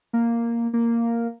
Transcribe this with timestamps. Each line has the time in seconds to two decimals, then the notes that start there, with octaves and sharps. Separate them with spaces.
0.13 A#3
0.73 A#3